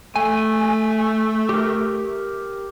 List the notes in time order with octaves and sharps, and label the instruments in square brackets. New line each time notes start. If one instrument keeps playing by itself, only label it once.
[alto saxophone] A3 [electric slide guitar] G#5
[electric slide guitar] G4 A#4